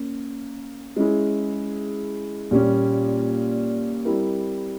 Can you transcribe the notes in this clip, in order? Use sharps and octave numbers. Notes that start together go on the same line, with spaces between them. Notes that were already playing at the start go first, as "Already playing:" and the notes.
Already playing: A#3 C#4
G#3 C#4 E4 G#4
A#2 G3 C#4
G3 C4 E4 A#4